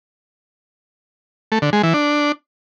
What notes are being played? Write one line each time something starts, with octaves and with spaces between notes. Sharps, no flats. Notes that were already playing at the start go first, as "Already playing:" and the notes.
A3
D3
G#3
E3
D4